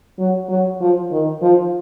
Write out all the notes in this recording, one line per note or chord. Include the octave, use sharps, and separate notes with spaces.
F#3
F#3
F3
D#3
F3